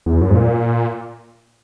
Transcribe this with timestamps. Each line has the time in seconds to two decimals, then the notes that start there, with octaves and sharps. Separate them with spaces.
0.06 E2
0.21 F#2
0.30 G#2
0.34 A#2